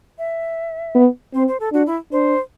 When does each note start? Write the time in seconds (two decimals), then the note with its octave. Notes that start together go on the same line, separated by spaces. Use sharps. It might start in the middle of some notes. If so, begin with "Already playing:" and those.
0.19 E5
0.95 B3
1.34 C4 C5
1.48 C5
1.60 A4
1.73 D4 F#4
1.87 E4
2.12 D4 C5